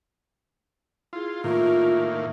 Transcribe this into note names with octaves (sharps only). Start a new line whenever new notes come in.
E4 F4 G#4
A2 D#3 A#3 F4 E5 C#6